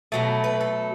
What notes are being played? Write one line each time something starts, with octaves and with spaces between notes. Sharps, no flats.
B2 F#3 A3
B4
A4